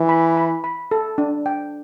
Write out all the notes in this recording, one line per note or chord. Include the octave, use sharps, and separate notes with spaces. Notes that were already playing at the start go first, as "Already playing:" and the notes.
Already playing: E3
B5
B5
B5
A4
D4
G5